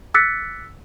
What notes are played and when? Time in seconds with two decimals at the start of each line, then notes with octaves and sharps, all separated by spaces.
0.14 D6 E6 F#6 A6 B6 C#7